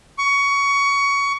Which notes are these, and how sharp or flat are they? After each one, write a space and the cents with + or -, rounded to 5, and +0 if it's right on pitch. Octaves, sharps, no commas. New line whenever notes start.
C#6 +20